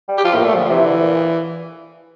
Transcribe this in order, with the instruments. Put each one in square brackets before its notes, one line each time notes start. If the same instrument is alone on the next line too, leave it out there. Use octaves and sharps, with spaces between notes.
[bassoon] G3
[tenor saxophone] G4
[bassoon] F3 [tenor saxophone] F4
[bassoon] A2 [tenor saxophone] A#3
[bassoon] A#2 [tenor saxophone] A3
[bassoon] D3 [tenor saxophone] F3
[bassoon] C3 [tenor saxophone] E3
[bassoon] D3
A#2